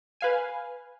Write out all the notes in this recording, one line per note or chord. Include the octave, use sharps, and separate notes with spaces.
B4 F5 G#5